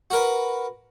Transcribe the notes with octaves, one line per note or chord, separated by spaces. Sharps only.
F#4 A#4 B4